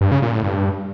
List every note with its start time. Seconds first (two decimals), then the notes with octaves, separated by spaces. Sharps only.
0.01 G2
0.12 C#3
0.22 A#2
0.33 A2
0.44 G2